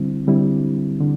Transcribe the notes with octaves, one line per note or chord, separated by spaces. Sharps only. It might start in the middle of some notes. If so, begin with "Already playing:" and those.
Already playing: D3 G3 C4 E4
D3 G3 C4 E4
D3